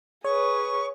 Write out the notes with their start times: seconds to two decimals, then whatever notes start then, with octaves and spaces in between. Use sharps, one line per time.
0.25 G#4 B4 C#5 C#6